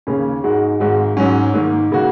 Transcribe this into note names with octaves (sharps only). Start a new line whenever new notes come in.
D#2 C#3 A#3 C#4
G#2 G#3 D#4 F#4
G#1 G#2 G#3 F#4
G#2 F#3 C#4
G#2 D#3 A#3
C#3 A#3 F#4